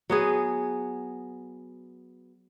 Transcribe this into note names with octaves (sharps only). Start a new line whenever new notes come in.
F#3 B3 G#4